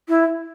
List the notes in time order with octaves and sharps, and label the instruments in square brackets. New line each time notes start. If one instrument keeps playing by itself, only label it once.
[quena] E4